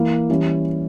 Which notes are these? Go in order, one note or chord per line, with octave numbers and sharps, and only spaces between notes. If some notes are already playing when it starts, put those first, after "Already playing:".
Already playing: E3 A#3 E4
E3 G3 C#4